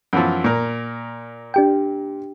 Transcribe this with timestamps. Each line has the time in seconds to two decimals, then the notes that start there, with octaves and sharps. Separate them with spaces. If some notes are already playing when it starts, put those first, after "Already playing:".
0.13 F#2 E3 F3
0.44 A#2 A#4
1.54 D4 G4 G5